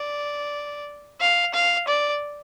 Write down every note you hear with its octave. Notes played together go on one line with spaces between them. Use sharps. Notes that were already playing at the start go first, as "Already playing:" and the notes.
Already playing: D5
F5
F5
D5